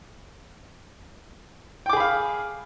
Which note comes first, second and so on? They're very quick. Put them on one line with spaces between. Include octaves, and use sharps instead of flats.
G5 D6 G#4 B5 F5